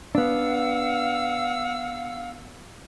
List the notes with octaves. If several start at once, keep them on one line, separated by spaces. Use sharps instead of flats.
B3 D4 F5 F#5 E6